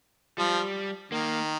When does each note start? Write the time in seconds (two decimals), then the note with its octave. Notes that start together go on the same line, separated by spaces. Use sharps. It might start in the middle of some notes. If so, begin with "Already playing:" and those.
0.38 F3 G3
1.12 D#3 A#3